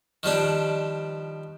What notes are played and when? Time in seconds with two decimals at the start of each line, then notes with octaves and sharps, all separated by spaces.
0.23 D#3 F3 G3 D4